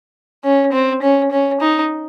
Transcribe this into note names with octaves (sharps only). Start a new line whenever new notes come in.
C#4
C4
C#4
C#4
D#4